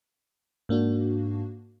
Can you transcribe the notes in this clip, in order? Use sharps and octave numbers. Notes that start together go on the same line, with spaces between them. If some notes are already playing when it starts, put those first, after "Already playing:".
G#2 A#3 D4 F#4